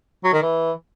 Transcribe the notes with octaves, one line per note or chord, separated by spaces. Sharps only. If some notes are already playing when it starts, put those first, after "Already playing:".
F#3
D#3
E3